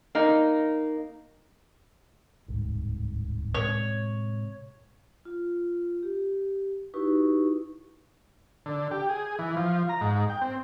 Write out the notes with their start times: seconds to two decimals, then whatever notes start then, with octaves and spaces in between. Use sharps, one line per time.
0.15 A#3 D#4
2.48 D1 C2 G#2
3.54 A2 C3 G#3 C#5
5.25 F4
6.03 G4
6.94 D#4 E4 F#4 G4 B4 C#6
8.66 D3
8.91 G4
9.09 G#4
9.39 E3
9.56 F3
9.89 A#5
10.01 G#2
10.30 G5
10.41 C4